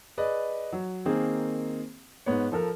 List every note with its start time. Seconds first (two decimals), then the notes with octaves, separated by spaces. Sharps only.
0.18 G#4 B4 D5 D#5
0.73 F#3
1.05 D#3 A#3 C4 G#4
2.26 G#2 B3 C#5
2.52 F3 A4 A#4